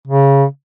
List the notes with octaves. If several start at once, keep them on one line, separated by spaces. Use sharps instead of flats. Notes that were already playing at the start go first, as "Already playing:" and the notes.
C#3